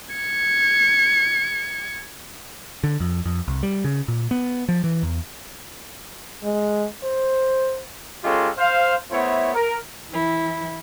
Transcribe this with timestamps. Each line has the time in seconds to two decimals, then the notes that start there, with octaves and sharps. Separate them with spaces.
0.14 G#6 C#7
2.84 D3
3.00 F2
3.26 F2
3.48 C2
3.63 G3
3.84 C#3
4.08 A#2
4.31 B3
4.69 F3
4.84 E3
5.03 E2
6.44 G#3
7.04 C5
8.24 G#3 C#4 F4 G4 A4
8.57 C5 F5
9.12 A3 B3 E4 C5 C#5
9.55 A#4
10.09 E3 E4